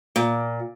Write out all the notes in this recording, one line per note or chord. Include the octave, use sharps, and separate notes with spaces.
A#2